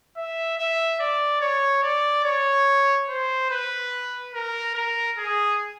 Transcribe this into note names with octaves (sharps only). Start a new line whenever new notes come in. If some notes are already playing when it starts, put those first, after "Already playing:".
E5
E5
D5
C#5
D5
C#5
C5
B4
A#4
A#4
G#4